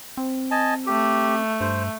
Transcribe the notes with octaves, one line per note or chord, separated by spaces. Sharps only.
C4
D#5 G#5 A5
A3 G4
G2 C5